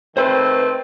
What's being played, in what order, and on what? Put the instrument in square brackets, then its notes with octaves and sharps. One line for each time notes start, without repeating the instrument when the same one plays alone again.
[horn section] D#3 A3 C4 [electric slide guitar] B4 C5